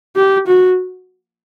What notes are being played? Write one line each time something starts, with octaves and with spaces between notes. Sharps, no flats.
G4
F#4